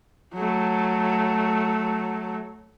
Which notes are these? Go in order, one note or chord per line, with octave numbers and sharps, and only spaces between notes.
F#3 A3